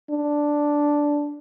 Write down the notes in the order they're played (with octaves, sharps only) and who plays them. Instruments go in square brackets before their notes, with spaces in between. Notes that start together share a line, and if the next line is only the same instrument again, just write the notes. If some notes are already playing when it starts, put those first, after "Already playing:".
[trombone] D4